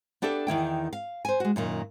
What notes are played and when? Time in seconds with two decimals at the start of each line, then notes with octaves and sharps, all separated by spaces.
0.22 B3 D4 G4 A4 E5
0.47 E2 D#3 E4 G5
0.93 F5
1.25 C5 G#5
1.40 G#3 F#4
1.56 F#2 A#2 D#3